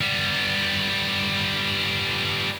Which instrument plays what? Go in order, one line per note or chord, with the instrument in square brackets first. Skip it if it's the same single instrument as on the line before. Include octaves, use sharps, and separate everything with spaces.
[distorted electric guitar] G3 B3